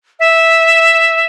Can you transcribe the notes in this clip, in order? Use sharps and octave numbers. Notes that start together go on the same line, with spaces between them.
E5